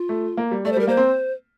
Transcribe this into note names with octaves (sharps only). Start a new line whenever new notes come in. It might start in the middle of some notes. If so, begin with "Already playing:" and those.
Already playing: F4
A3
A#3
G3
A3 D5
C5
G3 A#4
A#3 C5
C4